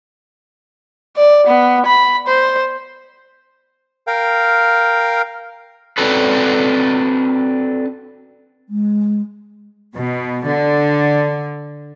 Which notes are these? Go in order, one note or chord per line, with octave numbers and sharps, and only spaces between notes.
D5
B3
B5
C5
A#4 F5 G5
C4 D4 F#4 A4 B4
G#3
B2
D3